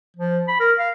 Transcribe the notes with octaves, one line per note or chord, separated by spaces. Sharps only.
F3
B5
A#4
F5